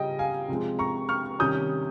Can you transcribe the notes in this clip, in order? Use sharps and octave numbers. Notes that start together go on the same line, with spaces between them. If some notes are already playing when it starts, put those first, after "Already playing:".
Already playing: C#3 G3 C#4 D#5 G5
F5 G#5
C3 F3 G#3 C4
A#5 C#6
C#6 F6
C3 D#3 G3 C#4 D#6 G6